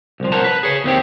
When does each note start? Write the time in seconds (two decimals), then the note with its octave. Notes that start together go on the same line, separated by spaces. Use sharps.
0.20 C2 F3
0.32 A#4 C5 C#5 F#5 A5 A#5
0.44 B4
0.63 G#4 C#5
0.84 D#2 C4 E4 G4